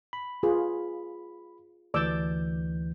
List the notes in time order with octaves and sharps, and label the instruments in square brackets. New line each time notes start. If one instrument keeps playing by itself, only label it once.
[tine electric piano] B5
[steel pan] F4 G#4 B4
[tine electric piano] D2 E3 G6 [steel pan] D5 D6 E6